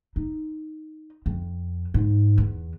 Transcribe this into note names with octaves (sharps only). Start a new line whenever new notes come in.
D#4
F2
G#2
E2